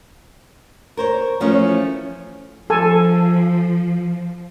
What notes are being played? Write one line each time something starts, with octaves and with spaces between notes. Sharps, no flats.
A#4 C5 C#5
E3 F3 A3 C#4 F4
F3 A4 G#5